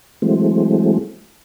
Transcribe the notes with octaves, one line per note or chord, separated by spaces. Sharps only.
E3 F#3 G#3 A3 C4